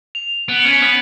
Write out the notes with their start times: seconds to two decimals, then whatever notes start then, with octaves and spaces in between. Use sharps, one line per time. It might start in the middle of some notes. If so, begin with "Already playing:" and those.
0.15 F7
0.48 B3 D7
0.60 C#7
0.65 C#4
0.71 B6
0.82 B3